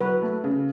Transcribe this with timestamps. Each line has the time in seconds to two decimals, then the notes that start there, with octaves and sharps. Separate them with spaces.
0.01 F#3 B4
0.22 A3
0.44 C#3